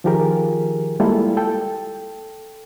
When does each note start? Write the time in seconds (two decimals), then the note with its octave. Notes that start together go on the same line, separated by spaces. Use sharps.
0.04 D#3 F3 F4 G4 G#4 A#4
1.00 G3 G#3 A#3 E4 F4 A4
1.37 A4 G5